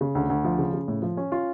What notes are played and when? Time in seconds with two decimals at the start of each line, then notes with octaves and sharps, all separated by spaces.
0.01 C#3
0.15 D2
0.30 D2
0.44 F3
0.59 C#3
0.73 C#3
0.88 A2
1.02 F3
1.17 C#4
1.32 F4